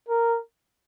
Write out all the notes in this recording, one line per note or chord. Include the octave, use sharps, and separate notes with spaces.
A#4